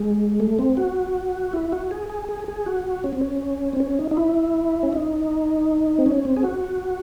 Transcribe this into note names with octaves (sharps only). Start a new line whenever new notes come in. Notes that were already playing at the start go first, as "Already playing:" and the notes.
Already playing: G#3
A3
C4
F#4
E4
F#4
G#4
G#4
G#4
G#4
F#4
C#4
C4
C#4
C4
C#4
D#4
D#4
E4
C#4
D#4
C4
C#4
C4
G#4
F#4